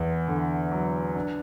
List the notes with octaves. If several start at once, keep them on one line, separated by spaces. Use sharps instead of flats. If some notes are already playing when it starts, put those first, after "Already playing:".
Already playing: E2
D3
F#3
D4